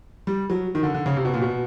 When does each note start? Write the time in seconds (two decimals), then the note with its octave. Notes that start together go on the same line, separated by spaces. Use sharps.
0.27 G3
0.50 F#3
0.75 D#3
0.83 D3
0.94 D3
1.06 C#3
1.16 C3
1.25 B2
1.34 A#2
1.41 B2